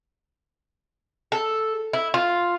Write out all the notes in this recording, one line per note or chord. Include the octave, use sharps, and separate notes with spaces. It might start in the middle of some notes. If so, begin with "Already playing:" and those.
A4
E4
F4